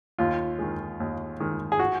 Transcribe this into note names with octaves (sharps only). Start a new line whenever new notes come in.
D#2 F4
D#3 G#3
D#2
D#3 G#3
G#4
F#4